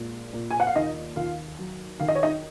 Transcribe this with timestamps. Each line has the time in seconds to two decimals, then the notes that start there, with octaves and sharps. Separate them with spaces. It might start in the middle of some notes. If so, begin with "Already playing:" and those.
Already playing: A#2 G#3
0.33 A#2
0.51 G#5
0.60 F#5
0.67 F5
0.75 D#2 D#4 D#5
1.16 D#2 F4 F5
1.59 F#3
2.00 D#3 F5
2.08 D#5
2.15 C#5
2.23 D#4 D#5